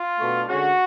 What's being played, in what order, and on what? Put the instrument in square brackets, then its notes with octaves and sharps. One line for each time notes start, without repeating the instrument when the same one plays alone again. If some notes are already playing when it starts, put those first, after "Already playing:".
Already playing: [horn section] F4
B2 A3 D4
D3 G#3 C#4 F#4